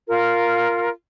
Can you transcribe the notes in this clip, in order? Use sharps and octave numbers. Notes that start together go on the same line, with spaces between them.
F4 A#4